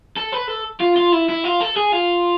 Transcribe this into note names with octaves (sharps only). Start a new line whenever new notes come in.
A4
B4
A4
F4
F4
E4
E4
F4
A4
G#4
F4